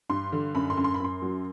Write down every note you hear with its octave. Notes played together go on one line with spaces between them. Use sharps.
G2 C6
D3
F#2 B5
C6
F#2
C6
B5
F#2 C6
F#3